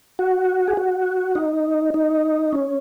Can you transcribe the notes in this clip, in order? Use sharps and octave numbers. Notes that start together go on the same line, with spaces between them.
F#4
G#4
F#4
D#4
D#4
C#4